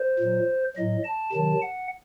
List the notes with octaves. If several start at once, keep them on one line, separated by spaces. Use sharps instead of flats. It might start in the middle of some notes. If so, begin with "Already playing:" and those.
Already playing: C5
A#2 F#3
A2 F#3 D#5
A5
C3 D#3 F#3 A5
F#5